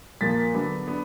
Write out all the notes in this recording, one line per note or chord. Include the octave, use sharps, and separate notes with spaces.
A#2 F3 A#3 A6 B6
D3 F#3 B3 D4
B3 D4